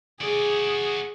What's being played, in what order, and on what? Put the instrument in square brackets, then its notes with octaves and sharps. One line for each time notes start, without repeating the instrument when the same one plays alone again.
[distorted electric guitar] F#4 D5 [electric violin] G#4